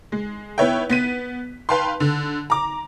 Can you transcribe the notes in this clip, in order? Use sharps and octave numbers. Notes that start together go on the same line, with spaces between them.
G#3
B3 E4 B4 C#5 E5 G5
B3 B6 D#7
B4 F5 G5 A5 C6
D3
A#5 D6